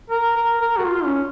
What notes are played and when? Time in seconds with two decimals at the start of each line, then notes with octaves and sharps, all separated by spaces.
0.10 A#4
0.36 A#4
0.61 A#4
0.78 F#4
0.85 F4
1.04 C#4